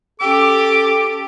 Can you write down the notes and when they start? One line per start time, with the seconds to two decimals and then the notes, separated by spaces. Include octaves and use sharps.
0.20 C#4 G4 A4 D6 E6